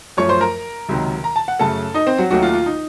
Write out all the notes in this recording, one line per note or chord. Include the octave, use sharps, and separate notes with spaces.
F#2 F3 A3 C#5 C#6
C5 C6
A#4 A#5
C#2 C3 D#3 F#3
A#5
A5
F#5
F#2 C#3 A3 A4 A5
D#4 D#5
C4 C5
F#3 F#4
D#2 D#3 F#3 A3 F#4
F4
F4
D#4